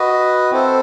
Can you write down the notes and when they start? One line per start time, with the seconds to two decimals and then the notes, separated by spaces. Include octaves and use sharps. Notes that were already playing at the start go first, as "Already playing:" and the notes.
Already playing: F#4 B4 D#5
0.51 C4 E4 A4 C5